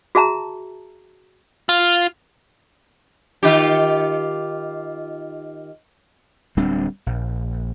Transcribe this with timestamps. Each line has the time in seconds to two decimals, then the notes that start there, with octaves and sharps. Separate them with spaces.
0.15 F#4 G#4 E5 A5 A#5
1.69 F4
3.43 D#3 F4 G4
6.57 D1 G3 C4 D4
7.06 A#1